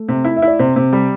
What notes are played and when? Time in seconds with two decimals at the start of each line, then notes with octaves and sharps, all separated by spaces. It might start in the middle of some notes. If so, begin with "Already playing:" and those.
Already playing: A3
0.08 C3
0.25 E4
0.36 E5
0.42 E4
0.48 D5
0.59 C3 C5
0.76 C3
0.93 G3